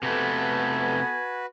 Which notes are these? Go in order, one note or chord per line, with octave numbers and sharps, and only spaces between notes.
C3 A3 B3 F#4 A4 B4 G#5